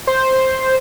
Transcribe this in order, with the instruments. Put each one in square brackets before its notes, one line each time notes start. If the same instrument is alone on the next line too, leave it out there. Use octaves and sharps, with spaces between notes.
[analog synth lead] C5